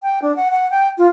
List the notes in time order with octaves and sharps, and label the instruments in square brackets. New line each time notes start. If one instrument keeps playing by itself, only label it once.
[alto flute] G5
D4
F#5
F#5
G5
F4